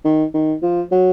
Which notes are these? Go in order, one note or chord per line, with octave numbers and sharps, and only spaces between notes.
D#3
D#3
F3
F#3